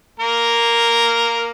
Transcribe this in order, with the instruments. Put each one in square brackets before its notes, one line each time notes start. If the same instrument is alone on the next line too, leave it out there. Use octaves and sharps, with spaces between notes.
[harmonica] A#3 A#4